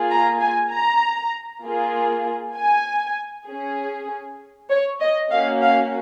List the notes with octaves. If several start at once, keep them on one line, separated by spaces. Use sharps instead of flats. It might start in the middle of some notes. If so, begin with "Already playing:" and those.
Already playing: A#3 F4 G#4
A#5
G#5
A#5
A#3 F4 G#4
G#5
C#4 G#4
C#5
D#5
A#3 C#4 F#4 F5
F5